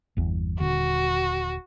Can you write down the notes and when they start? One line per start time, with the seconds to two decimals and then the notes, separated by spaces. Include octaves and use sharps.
0.17 G1 E2
0.60 D#1 D3 F#4